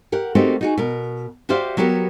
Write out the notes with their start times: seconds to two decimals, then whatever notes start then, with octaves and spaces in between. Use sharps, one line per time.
0.12 G4 A#4 F#5
0.35 A3 A#3 C4 D#4 F#4 G4
0.61 D#4 F#4 G#4
0.78 B2 A#4
1.49 F#4 G4 C5 D5 E5 F5
1.77 F#3 B3 F#4 G4 A#4